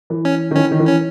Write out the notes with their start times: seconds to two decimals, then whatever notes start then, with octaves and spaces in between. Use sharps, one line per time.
0.10 E3
0.25 C#4
0.51 D#3
0.56 E3 C#4
0.71 D#3
0.79 E3
0.87 C#4